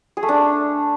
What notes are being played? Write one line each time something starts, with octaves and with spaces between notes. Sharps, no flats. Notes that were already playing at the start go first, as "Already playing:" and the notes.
G#4
A3
D4